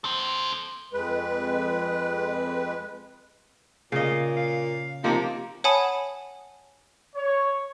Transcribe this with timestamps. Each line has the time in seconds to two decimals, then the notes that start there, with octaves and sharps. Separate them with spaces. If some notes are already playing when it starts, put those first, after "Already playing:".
0.04 A4 C5
0.93 F2 G#3 B4
3.92 A#2 C#3 D#5 F5
4.37 F5
5.04 C3 F3 A#3 D#4
5.64 C#5 F#5 G#5 A5 B5 D#6
7.15 C#5